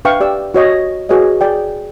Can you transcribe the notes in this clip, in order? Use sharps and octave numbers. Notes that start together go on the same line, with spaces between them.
D4 B4 E5 F5 G5 C#6
G4 D5 E6
F#4 C#5 D#5
F#4 G#4 B4 C#5 D#5
G#4 D5 G5